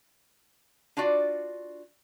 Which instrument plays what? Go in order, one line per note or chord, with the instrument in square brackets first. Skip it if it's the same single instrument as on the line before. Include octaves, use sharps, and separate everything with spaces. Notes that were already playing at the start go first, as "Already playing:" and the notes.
[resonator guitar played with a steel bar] D4 F4 F#4 D5